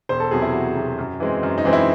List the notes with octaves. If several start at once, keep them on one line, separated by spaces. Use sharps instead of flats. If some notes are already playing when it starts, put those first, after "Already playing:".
E1 C5
A4
E2 C3 F#3 G#4
E4
E1 F#4
E2 C3 F#3
F#2
E3 G#3 C4
F#2
D#4
E3 G#3 C4
E4